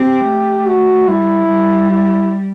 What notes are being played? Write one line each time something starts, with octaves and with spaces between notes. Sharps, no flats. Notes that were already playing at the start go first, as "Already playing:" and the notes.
Already playing: C4 G4
A3
F#4
G3 E4
G3
E4